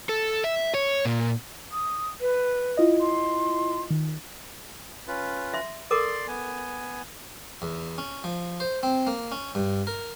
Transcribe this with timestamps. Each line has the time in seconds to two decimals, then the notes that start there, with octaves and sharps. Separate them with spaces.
0.09 A4
0.44 E5
0.74 C#5
1.05 A#2
1.72 D#6
2.21 B4
2.77 E4 F4 D#5
3.01 C6
3.90 D#3
5.07 C#4 F4 B4
5.54 E5 C6
5.91 A4 A#4 D5 C6 D6
6.28 B3 G#5
7.62 E2
7.98 C#4
8.24 F3
8.60 C5
8.83 C4
9.07 A#3
9.32 C#4
9.55 G2
9.87 A#4